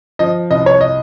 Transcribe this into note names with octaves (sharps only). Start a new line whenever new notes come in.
F3 D#5
C2 D#5
C#5
D#5